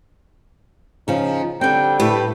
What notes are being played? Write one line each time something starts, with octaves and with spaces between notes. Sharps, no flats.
C#3 F3 D#4
D3 G3 C4 G5
A2 A3 G4 B4